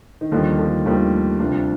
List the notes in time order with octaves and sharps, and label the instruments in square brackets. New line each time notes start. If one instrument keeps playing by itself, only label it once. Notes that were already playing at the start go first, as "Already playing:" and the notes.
[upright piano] D#3
[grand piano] D#2 D#3 G3 A#3 [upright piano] D3 F3
[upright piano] D3 F3
[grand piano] D#2 D#3 G3 A#3 [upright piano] F3 A3
[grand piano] D2 C3 G3 D4 F4